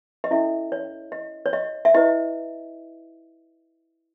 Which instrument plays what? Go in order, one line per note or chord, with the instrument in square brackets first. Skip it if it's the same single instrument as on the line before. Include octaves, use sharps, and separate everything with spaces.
[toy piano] D#5
C#4 E4 A4 E5
C#5
D#5
C#5
D#5
E5
E4 B4 D#5